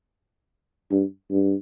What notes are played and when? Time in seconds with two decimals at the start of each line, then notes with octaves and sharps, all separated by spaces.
0.91 G2
1.30 G2